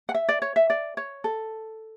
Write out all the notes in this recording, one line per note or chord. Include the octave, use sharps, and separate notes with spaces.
F#5
E5
D5
C#5
E5
D5
C#5
A4